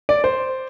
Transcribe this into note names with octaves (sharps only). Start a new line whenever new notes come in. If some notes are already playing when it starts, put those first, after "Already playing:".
D5
C5